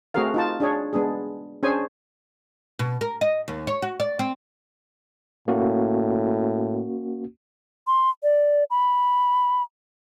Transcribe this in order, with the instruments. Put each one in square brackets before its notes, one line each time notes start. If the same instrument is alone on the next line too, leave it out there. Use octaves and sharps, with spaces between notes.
[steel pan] A3 C4 F#4 G#4 A#4 F5
D#4 F4 A5
D4 G#4 C#5
G#3 B3 D4 G#4
C#4 D4 G#4 C5 C#5 G#5
[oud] B2
A#4
D#5
D#2
C#5
F#4
D5
C4
[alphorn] A2 [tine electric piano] A#3 C#4 F#4
[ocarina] C6
D5
B5